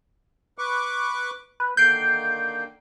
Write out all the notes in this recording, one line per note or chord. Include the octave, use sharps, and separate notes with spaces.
B4 C#6 D6
B4
D3 D#3 A#3 G6 C7 D7